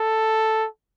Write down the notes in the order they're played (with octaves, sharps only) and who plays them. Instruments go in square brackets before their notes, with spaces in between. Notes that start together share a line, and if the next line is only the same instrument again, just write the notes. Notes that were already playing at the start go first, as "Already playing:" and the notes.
Already playing: [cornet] A4